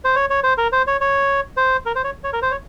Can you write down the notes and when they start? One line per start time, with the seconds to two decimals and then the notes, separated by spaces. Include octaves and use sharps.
0.05 C5
0.16 C#5
0.30 C#5
0.44 C5
0.58 A#4
0.72 C5
0.87 C#5
1.01 C#5
1.57 C5
1.86 A#4
1.95 C5
2.04 C#5
2.24 C#5
2.33 A#4
2.42 C5
2.51 C#5